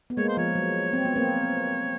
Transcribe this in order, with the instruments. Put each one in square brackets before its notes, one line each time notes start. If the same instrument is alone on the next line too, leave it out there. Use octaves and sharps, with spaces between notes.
[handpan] B3
[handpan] G#3 A#3 [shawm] C#5
[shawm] C5
[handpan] F3 [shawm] C#5
[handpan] F#3
C4
B3
A#3 C4